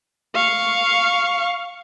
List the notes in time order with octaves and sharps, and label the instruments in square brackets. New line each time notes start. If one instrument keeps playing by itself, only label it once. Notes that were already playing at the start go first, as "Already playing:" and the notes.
[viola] F5 C#6